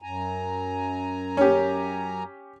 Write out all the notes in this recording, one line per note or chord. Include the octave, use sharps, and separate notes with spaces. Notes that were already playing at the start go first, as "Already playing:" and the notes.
F#2 G#5 A#5
C#4 G4